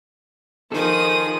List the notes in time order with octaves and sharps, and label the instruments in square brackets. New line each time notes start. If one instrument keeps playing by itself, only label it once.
[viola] D#3 F3 [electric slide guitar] D#4 A4 [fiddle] G#4 D#6